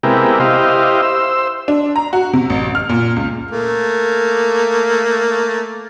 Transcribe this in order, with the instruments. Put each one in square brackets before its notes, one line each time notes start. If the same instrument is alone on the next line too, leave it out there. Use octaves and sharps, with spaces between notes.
[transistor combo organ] C3 G#3 B3 E4 G4 A#4
E4 G4 C5 D#5 F5
C5 E6
[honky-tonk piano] D4
A#5
F#4
C3
A1
F6
A#2
C#2
[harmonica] A3 A#3